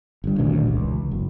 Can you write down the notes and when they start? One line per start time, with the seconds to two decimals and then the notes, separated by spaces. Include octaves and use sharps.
0.24 G1 G2
0.38 D2 A#2 D#3 C#4
0.66 E1 C#2
1.11 F#1